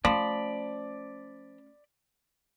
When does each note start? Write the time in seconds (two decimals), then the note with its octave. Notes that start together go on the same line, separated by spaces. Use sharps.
0.05 F3 A3 C#4 D5 B5